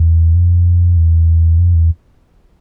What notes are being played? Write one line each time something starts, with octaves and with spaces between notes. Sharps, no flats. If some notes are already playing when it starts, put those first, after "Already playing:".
Already playing: E2
F2
E2
F2
E2